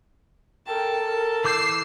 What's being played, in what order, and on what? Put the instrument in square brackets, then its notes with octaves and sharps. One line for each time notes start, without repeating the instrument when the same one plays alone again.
[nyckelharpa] A4 A5 [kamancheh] A#4 G5
[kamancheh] A#4
[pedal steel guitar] E3 D6 G6 [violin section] E6 C7